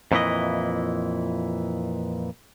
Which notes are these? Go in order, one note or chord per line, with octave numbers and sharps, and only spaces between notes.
F2 A#2 E3 E4 D#5